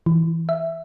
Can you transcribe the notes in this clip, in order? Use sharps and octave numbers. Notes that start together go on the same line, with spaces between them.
E3
E5